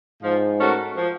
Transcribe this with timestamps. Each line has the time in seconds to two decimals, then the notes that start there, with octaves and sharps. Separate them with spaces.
0.23 G#2 F3
0.60 A3 C#4 F#4 A#4
0.97 F3